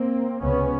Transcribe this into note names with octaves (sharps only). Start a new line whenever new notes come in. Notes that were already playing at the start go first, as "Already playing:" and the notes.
Already playing: A#3 C4
C#2 C3 B3 C#4